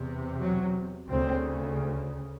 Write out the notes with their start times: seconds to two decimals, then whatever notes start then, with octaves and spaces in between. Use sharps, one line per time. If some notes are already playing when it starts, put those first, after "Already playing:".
Already playing: E2 C3
0.41 F#3
1.10 D2 C#3 C4